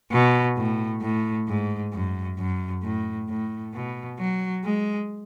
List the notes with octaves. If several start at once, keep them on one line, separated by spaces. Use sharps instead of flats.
B2
A2
A2
G#2
F#2
F#2
A2
A2
B2
F#3
G#3